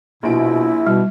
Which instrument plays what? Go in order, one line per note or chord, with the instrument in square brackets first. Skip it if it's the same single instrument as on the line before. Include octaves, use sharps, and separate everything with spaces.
[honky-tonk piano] A#1 D7 [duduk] B2 [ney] E4
[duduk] B2 [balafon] G3